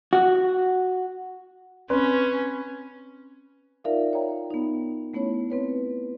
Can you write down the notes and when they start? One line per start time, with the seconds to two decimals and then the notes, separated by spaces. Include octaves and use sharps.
0.13 F#4
1.90 C4 C#4 B4
3.84 D#4 F4 A#4 D5 E5 F5
4.13 C#5 G5 A#5
4.51 B3 D#4
5.14 A3 B3 C#4 E4 C#5
5.50 C4 B4 C#5